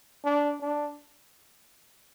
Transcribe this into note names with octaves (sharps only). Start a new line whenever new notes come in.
D4
D4